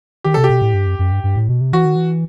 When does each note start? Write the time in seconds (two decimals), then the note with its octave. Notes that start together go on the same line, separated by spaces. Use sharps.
0.24 D#3 G4
0.34 C3 A4
0.44 G4
0.49 B2
0.62 A2
0.74 G2
0.86 F#2
0.99 F#2
1.12 G2
1.24 G2
1.36 A2
1.49 B2
1.61 C3
1.73 E3 F#4
1.85 D#3
1.96 E3